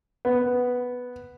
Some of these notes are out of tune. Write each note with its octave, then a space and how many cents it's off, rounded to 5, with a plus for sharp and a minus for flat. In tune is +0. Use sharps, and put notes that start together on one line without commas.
B3 +0